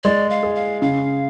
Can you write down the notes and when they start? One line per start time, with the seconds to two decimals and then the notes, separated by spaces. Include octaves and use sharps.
0.04 G#3 D5
0.30 F5
0.43 G#4
0.55 F5
0.82 C#3 F5